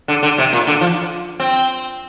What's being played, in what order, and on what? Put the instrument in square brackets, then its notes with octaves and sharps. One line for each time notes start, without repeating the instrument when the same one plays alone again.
[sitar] D3
D3
C3
A#2
D3
F3
C4